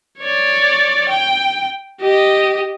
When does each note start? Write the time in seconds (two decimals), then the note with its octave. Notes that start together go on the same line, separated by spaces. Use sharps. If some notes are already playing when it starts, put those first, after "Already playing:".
0.19 C#5 D5
1.09 G5
2.01 G4 D#5